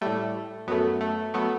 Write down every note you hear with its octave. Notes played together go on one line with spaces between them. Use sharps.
A2 G3 A3
F#2 F#3 A3 B3
A3
F#3 A3 B3